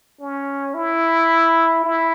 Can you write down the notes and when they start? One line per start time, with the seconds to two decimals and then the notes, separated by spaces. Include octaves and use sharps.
0.20 C#4
0.74 E4
1.84 E4